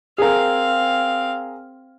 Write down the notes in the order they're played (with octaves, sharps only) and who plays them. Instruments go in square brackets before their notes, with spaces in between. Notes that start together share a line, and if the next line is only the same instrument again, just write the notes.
[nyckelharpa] C4 F5 [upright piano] G#4 A#4